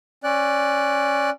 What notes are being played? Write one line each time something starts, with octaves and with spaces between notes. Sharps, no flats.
C#4 D5 F#6